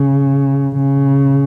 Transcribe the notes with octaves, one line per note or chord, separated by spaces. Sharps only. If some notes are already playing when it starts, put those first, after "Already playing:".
Already playing: C#3
C#3